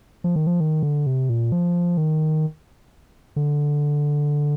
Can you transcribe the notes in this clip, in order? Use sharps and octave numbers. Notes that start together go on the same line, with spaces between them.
F3
D#3
F3
D#3
D3
C3
A#2
F3
D#3
D3